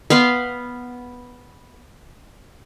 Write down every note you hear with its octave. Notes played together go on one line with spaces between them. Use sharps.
B3 F5 C6